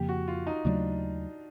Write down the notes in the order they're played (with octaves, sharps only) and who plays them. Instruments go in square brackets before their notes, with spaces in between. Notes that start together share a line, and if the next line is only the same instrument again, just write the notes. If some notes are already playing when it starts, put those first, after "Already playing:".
Already playing: [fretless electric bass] F2 C#3 F3 A#3 [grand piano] G4
[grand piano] F#4
F4
D#4
[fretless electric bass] D#2 C#3 F#3 A3 [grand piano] D4